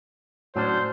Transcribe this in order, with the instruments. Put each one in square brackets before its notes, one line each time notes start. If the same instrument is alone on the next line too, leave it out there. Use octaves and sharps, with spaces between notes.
[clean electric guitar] A2 C#4 D4 [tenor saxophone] F#3 [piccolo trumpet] C5